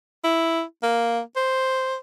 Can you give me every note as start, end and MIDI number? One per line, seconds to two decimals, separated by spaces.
0.24 0.62 64
0.83 1.21 58
1.36 1.97 72